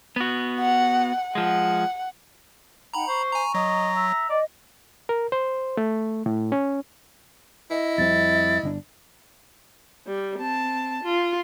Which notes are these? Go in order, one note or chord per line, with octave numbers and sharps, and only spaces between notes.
B3 F#4
F#5
F3 G#3 F#5
D#4 F#5 G5 A#5 B5
C5 C#6
G#5 A#5
F#3 D#5 A#5
E5
D5 D#5
A#4
C5
A3
A2
C#4
E4 D#5
F2 G3 C4 A6
G1 C3 D4
G3
C4 A5
F4